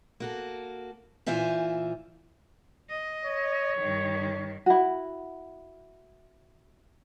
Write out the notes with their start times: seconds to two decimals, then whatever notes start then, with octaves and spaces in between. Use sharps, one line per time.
0.20 A#3 F#4 A4
1.26 A#2 E3 F4 C5 E5 G#5
2.89 D#5
3.25 C#5
3.78 G2 D#3
4.66 E4 F#4